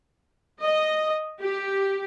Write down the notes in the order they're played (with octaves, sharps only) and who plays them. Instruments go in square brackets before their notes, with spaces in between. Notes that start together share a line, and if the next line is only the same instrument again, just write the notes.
[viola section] D#5
G4